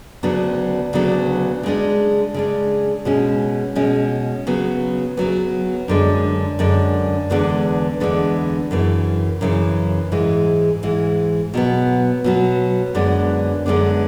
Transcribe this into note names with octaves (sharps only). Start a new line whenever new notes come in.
D2 C#3 F#3 B3 D4
D2 C#3 F#3 B3 D4
C#3 G#3 D4
C#3 G#3 D4
B2 G#3 C#4
B2 G#3 C#4
C#3 F#3 B3
C#3 F#3 B3
F#2 D3 G#3 D4
F#2 D3 G#3 D4
E2 D3 G#3 B3 D4
E2 D3 G#3 B3 D4
F#2 C#3 E3
F#2 C#3 E3
G#2 E3 G#3
G#2 E3 G#3
B2 F#3 B3
B2 F#3 B3
F#2 D3 G#3 B3 D4
F#2 D3 G#3 B3 D4